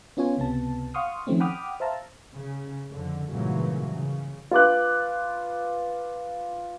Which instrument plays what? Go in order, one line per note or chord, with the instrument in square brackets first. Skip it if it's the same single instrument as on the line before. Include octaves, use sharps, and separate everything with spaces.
[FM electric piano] B3 C#4 F4 C#5 G#5
C#2 C3 B3 A5
F5 F#5 C6 C#6 D#6 F6
D#3 F3 A3 C4 C#4
F#5 G5 B5 D6 D#6 F6
C5 E5 F5 A5 A#5
[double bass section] C#3
F2 D3
G#1 G2 A#2 C#3 E3 F#3
C#3
[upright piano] F4 B4 D6 F#6